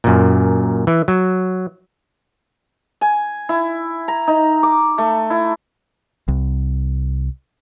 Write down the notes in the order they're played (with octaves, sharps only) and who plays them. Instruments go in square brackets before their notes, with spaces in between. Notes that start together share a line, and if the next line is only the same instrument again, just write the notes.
[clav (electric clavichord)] F#2 A#2
E3
F#3
[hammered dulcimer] G#5
E4
A#5
D#4
D6
A3
E4
[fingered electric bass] C2